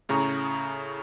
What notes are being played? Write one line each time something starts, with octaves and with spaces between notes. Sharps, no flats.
A2 C#3 G#4 A#5 C#6